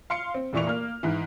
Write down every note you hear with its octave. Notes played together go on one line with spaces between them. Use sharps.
F5 C6 C#7
C4
F1 A#2 E3 D5 C#6 F7
A#3 F6
G#2 E3